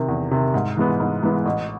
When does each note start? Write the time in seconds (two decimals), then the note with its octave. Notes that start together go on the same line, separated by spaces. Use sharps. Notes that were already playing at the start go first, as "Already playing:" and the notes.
Already playing: C3 D#3
0.08 E2
0.31 C3 D#3
0.54 G#2
0.77 E3 G#3 B3
1.00 G#2
1.23 E3 G#3 B3
1.45 A1